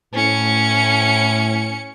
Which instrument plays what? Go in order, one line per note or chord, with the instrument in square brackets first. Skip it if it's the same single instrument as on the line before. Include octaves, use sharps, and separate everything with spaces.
[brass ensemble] A2 [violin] C#4 C#7